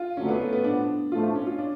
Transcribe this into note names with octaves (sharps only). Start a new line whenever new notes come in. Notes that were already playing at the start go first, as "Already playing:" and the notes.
Already playing: F4
F#1 F2 D3 F#3 A3 C#4
B3
A3
B3
A2 F3 B3 D4
A2 F3 A3 F4
D4
C#4
F4
D4